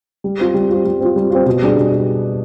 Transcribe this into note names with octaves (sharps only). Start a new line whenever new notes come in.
G3
C4 F4
G3
C4 F4
G3
C4 F4
G3
C4 F4
B2
G3 D4 G#4
B2